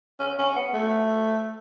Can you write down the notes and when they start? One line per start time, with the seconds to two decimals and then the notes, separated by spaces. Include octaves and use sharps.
0.20 C#4
0.39 C#4
0.56 B3
0.74 A3